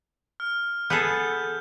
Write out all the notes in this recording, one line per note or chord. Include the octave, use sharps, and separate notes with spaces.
F6
B3 G#4 A4 G6